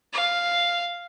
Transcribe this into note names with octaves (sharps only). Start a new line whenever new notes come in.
F5